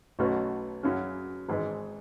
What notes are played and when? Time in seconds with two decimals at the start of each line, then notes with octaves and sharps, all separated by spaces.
0.19 B1 B2 A3 C#4 F#4
0.83 F#2 C#3 F#3 C#4
1.49 G#1 G#2 E3 G#3